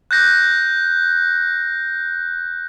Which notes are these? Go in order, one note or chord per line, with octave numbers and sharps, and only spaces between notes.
F#6 G6 A#6